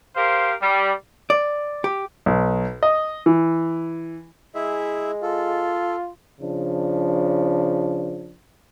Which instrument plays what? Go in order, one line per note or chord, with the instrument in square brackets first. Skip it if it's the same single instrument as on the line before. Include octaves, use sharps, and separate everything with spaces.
[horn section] G4 A#4 C5 F5
G3
[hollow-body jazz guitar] D5
G4
[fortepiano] B1
D#5
E3
[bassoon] G#3 [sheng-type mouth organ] E4 G#4 E5
[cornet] F4 [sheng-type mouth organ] A4
[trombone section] C#3 F3 D4